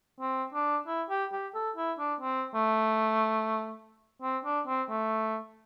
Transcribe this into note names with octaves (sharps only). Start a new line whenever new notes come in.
C4
D4
E4
G4
G4
A4
E4
D4
C4
A3
C4
D4
C4
A3